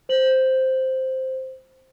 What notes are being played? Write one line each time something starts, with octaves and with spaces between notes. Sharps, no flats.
C5 F#7